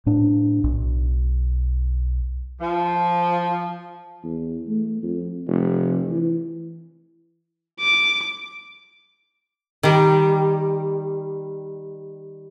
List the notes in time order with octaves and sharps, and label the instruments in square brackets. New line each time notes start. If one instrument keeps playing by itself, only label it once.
[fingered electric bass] A2 D4
B1
[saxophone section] F3
[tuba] E2
A3
F2
F1
E3
[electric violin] D6
[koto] D#3 G3